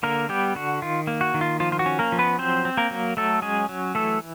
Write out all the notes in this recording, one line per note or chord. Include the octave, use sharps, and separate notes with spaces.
D3 A#3 A#4
G3 B3 G4
D3 F#4
D#3 F4
A#3
F#4
D#3
F4
F3 F4
F4
F#4
C#4
A#3 A#4
F3
B3 B4
F#3 C4 C5
C4
A#3 A#4
F#3
F#3 A3 A4
G#3 C#4 G#4
F#3
E3 A3 A4